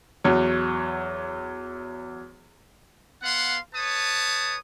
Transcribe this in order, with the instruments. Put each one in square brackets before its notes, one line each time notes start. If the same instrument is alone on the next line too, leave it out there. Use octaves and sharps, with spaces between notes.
[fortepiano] E2 F#3 C#5
[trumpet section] B3 F5 F#5 C6
B4 C#5 A5 D#6